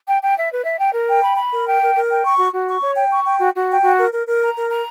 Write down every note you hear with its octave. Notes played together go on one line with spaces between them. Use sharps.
G5
G5
E5
B4
E5
G5
A#4
G5
B5
B5
A#4
G5
A#4
A#4
G5
C#6
F#4
F#4
C#6
C#5
G5
C#6
G5
F#4
F#4
G5
F#4
A#4
A#4
A#4
A#5
A#4
A#5